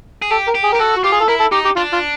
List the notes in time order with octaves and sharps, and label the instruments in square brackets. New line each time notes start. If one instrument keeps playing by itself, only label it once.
[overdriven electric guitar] G#4
[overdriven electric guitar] G4 [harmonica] A4
[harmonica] A#4
[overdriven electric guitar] G4
[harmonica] G#4
A#4
[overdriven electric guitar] G4
[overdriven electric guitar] F#4 [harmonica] A4
[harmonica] F#4
[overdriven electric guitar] F4 [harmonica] G4
[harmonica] G#4
A4
[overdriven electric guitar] E4 [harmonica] A#4
[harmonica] A4
[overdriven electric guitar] D#4 [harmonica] G4
[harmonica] G4
[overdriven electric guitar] D4 [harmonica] F4
[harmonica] F4